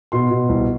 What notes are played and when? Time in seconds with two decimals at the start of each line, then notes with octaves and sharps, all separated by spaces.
0.12 B2 C6
0.30 B2
0.49 C2